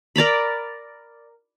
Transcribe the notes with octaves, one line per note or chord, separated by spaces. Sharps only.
A#4 D5 A#5 B5